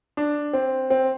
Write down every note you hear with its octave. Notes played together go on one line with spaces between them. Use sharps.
D4
C4
C4